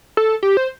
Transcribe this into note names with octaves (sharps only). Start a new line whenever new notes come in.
A4
G4
C5